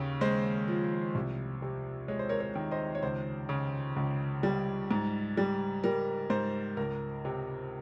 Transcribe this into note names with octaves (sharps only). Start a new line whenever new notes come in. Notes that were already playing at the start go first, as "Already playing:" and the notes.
Already playing: D#2 C#3
G#3 C5
F3
C2
C3
G#3 C#5
C5
A#4 C#5
A#4 C#5
D#3
C5 D#5
C#5
C#2 C5
C#3
C#2
G3
G#2
G3
G3 A#4
G#2 C5
C#2 A#4
C3